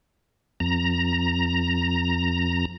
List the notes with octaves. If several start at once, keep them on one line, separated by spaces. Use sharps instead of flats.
F2 A#5